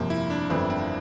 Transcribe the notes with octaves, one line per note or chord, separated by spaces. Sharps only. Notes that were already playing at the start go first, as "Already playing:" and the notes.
Already playing: G1 F2 C3 F3 A#3
E4
D4
G1 F2 E3 A3 C4
C4